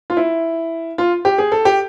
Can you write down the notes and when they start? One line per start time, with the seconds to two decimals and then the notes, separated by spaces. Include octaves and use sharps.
0.10 F4
0.17 E4
0.98 F4
1.25 G4
1.38 G#4
1.52 A4
1.65 G4